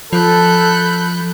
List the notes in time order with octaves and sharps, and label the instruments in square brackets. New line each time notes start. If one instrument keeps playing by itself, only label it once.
[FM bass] F3 [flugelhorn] A4 [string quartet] B5 F#6 G6